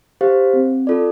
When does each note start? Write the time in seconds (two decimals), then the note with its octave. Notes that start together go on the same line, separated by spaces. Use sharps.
0.21 G4 C5 F5
0.54 C4
0.87 F4 A4 D5